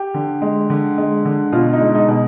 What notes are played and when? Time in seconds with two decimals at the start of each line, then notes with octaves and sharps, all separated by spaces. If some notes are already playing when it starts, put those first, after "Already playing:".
Already playing: G4
0.14 D3
0.42 G#3
0.70 D3
0.98 G#3
1.25 D3
1.52 B2 F4
1.73 D#4
1.80 G#3
1.95 D#4
2.08 B2